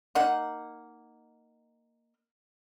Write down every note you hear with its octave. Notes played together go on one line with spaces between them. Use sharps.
A#3 D#4 F#5